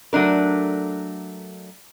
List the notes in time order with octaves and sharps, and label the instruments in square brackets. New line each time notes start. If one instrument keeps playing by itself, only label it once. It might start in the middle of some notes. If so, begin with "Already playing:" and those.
[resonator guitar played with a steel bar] F#3 A3 D4 A#4